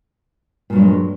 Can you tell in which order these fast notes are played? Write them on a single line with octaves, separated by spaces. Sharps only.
A#2 G2 F#3 G#3